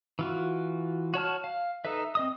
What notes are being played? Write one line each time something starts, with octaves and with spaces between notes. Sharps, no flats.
E3 F4 F#4
F#4 C#5 A5 F6
F5
D#4 A4 B4 E5
C4 D#5 D#6